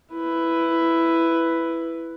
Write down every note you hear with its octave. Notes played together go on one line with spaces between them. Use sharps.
E4 B4